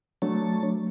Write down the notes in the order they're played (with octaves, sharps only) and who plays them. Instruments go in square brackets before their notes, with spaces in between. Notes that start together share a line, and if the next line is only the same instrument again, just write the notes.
[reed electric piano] F#3 A3 [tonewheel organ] D4 C#5 A5